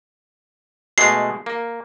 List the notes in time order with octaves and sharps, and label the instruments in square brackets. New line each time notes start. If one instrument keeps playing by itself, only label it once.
[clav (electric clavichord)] B2 G#3 A3 [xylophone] C7
[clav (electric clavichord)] A#3